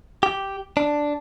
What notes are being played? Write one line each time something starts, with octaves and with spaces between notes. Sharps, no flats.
G4
D4